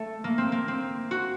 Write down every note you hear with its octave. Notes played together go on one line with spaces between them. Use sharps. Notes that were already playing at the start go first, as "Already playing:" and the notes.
Already playing: A3
A#3
C4
A#3
C4
F#4